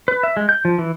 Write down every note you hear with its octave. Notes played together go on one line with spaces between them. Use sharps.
B4
E5
G#3
G6
F3
E3